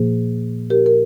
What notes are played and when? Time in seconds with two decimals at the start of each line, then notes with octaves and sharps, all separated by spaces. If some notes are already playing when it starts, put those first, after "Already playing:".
Already playing: A#2 F3 A#3 G#4 C5
0.70 G4 A#4
0.86 A#4